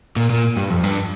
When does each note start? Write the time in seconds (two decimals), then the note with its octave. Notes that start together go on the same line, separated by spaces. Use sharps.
0.16 A#2
0.30 A#2
0.57 G2
0.70 F2
0.84 G2